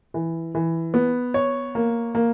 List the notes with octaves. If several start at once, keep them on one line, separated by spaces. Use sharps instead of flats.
E3
E3
B3
C#5
A#3
A#3